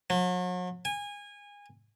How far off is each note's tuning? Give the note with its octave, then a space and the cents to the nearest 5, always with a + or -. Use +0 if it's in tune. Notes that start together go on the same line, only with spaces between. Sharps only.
F#3 -40
G#5 -25